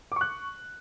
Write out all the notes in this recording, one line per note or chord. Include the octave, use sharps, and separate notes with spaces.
C#6 D6 F#6